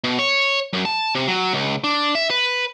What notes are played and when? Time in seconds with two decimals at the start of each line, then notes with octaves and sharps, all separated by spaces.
0.04 B2
0.19 C#5
0.73 F#2
0.85 A5
1.15 C3
1.28 F#3
1.53 C#2
1.84 D4
2.15 E5
2.30 B4